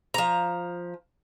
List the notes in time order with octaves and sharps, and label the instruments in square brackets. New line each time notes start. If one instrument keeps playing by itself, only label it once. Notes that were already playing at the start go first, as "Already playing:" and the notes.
[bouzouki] F3 A#5